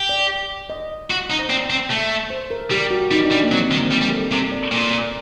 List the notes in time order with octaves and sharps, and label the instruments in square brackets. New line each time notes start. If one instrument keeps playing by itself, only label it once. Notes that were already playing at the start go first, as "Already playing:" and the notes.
Already playing: [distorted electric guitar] G4
[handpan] D5
D#5
[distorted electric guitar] F#4
D#4
[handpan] C5
[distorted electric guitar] C4 [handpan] D5
[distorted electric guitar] C4
A3
[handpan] C5
A#4
[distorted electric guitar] G3 [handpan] G4
[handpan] F#4
[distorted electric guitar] G3 [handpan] D#4
[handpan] D4
[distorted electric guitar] G3
[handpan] A#3
[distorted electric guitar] F#3 [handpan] C4
[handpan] C4
[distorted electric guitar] D#3
[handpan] A#3
[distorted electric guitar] G3 [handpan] C4
[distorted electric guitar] G3
[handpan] A#4
A4
[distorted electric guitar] C3 [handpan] A#4
[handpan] D5
[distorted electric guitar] A#2 [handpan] D5
[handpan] D5